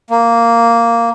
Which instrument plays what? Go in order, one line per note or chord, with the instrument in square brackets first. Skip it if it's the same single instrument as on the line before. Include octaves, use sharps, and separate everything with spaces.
[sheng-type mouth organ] A#3